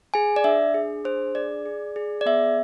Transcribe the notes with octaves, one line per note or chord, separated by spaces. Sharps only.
G#4 G#5
D5
D4 E5
G#4
D4 C5
G#4 D5
G#4
G#4
D5
B3 E5